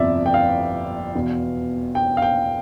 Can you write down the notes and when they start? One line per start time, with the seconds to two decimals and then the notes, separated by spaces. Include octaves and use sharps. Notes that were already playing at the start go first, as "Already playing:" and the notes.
Already playing: G1 F2 C3 D5 E5
0.26 G5
0.34 F5
1.15 E2 B2
1.95 G5
2.17 F5
2.22 G5